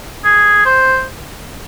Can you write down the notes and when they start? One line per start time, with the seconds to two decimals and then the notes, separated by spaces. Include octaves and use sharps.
0.24 G#4
0.65 C5